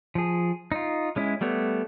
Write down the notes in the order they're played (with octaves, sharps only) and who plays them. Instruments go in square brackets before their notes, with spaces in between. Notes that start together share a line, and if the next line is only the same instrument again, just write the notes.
[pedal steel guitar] F3 G#4
D#4 F4
G#3 C#4 E4
G3 A3 B3 C#5